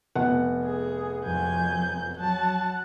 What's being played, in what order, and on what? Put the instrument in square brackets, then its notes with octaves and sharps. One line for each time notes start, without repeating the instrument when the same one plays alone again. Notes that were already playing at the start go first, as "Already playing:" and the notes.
[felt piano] F1 B3 F#5
[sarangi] G#4
[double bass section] F2 F#3 [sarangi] G#5 [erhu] G6
[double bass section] F#3 [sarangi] F#5 [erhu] A5